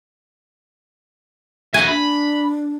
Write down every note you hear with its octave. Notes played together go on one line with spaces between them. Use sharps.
F#4 E5 G#5
D4 B5